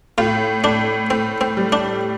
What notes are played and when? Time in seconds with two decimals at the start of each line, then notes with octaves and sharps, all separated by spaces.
0.18 A2 F4
0.64 A2 D4
1.10 A2 C4
1.41 C4
1.57 G3
1.72 D4